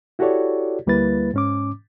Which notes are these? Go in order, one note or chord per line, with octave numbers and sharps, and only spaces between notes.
E4 F#4 G4 A4 C#5 D5
D2 G3 A#3 E4 B4 A6
G#2 C#4 D6